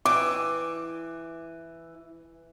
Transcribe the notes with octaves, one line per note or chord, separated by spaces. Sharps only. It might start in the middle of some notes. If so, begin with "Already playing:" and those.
E3 D6